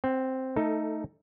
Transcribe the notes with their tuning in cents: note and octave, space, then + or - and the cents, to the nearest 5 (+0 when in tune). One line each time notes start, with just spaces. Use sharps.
C4 +0 F#5 +40
A3 +0 D#4 +5 A4 +20